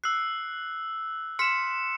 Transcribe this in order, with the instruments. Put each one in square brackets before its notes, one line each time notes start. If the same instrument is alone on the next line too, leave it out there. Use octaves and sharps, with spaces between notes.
[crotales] E6 F#6 [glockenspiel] C7
[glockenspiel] C6 F6 B6 [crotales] C#7 E7